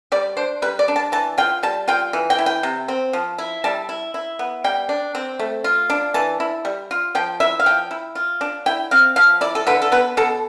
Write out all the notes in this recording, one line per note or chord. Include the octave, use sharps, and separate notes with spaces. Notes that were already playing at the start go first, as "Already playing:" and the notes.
G3 D5
D4 C5
G3 B4
D5
D4
A5
E3 A5
F4 G5
G3 A5
F4 G5
E3
G5
E4
G5
C3
C4
F3
E4
G3 A5
E4
E4
B3
G3 G5
D4
C4
A3
F4
D4
E3 A5
E4
G3
F4
F3 G5
E4 E5
F5
F3 G5
E4
F4
D4
E4 G5
C4 F5
F3 F5
E4 D5
A4
D3 B4
A4
B3 B4
B2 A4